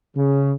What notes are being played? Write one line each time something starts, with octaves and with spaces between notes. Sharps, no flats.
C#3